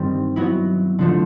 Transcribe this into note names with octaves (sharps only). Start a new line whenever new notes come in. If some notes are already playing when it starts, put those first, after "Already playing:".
Already playing: G2 D#3 G3 C4
F#3 B3 E4
D3 F3 A3